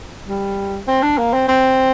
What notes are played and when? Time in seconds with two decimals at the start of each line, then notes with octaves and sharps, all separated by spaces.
0.27 G3
0.87 C4
1.02 D4
1.18 A#3
1.33 C4
1.48 C4